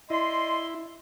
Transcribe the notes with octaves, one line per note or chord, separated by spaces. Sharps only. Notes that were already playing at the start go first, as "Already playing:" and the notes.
E4 D5 D#5 C6